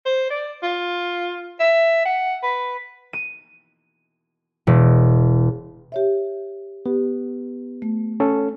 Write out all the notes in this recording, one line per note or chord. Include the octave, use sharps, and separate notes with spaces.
C5
D5
F4
E5
F#5
B4
D#7
E1
G4 C#5 E5
B3 G4
A3
C#4 A4